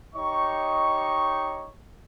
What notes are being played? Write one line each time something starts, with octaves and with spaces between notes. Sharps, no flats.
D#4 G4 C#5 D#5 C#6